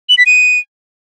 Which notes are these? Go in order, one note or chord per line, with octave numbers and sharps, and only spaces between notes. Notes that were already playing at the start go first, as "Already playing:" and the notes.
F#7
B6
D#7